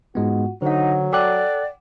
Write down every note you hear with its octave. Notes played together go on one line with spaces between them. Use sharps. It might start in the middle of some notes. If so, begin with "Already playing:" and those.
G#2 G#3 B3 F4 F#4
D3 F#3 D#4 C5 F#5
A4 D5 F#5 G5 D6 F#6